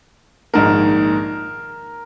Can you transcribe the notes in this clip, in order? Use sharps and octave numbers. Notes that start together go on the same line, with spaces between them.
A#1 G#2 D#3 A#3 A#4